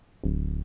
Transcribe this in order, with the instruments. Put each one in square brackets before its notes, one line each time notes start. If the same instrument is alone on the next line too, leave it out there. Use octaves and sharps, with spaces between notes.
[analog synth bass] D1